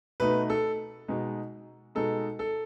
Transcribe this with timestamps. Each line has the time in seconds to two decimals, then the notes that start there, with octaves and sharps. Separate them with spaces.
0.20 B2 A3 D#4 B4
0.50 A4
1.08 B2 G#3 D#4
1.95 B2 G#3 D#4 A4
2.39 A4